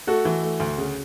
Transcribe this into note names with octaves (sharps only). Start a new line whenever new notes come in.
A3 F#4 A4
E3
A3
D2
C#3